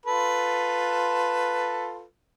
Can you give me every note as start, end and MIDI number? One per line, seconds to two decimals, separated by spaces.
0.06 2.05 65
0.06 2.05 69
0.06 2.05 71